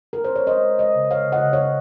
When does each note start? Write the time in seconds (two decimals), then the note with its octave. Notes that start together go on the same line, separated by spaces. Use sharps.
0.13 A#4
0.24 C5
0.36 C#5
0.47 G#3 C5 D#5
0.63 G#3
0.79 G#3 C5 D#5
0.95 C#3
1.11 G#3 C#5 F5
1.27 C#3
1.32 D#5 F#5
1.43 C#3
1.53 C#5 F5
1.59 C#3